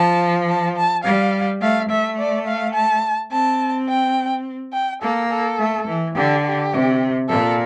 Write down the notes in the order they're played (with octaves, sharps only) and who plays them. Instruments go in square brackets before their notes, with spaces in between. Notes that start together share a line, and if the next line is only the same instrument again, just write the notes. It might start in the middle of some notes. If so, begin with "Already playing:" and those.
Already playing: [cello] F3 [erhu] A5
[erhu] A5
A5
[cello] G3 [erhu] F5
[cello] A3 [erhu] F5
[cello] A3 [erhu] E5
[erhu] D5
F5
A5
[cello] C4 [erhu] A5
[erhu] G5
G5
[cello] A#3 [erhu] A4
[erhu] A4
[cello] A3
E3
[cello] D3 [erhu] G4
[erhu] G4
[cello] C3
[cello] A#2 [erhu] A4